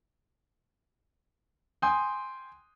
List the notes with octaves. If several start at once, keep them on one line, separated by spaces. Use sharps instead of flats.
G5 G#5 C6 D#6 G6